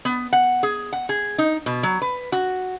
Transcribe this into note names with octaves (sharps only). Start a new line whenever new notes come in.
B3
F#5
G#4
F#5
G#4
D#4
B2
F#3
B4
F#4